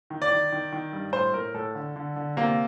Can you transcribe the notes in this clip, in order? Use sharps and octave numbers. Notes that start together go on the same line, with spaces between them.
D#3
D5
D#3
D#3
D#3
G2
A2 C5
A2 A#4
A2 A4
D3
D3
D3
C3 A#3